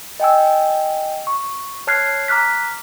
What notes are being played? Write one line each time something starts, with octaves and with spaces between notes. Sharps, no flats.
D#5 G5 G#5 E6
C#6
C#5 A5 F6 F#6 G#6 C7
A#5 D6 F6 F#6 B6